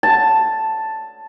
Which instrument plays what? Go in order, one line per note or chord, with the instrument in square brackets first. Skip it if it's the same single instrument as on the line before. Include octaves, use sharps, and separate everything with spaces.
[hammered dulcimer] A5